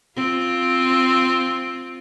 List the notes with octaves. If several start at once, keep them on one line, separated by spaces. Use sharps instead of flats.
C4 F4